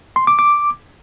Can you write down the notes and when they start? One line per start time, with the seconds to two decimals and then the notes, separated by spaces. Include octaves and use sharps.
0.16 C6
0.27 D6
0.39 D6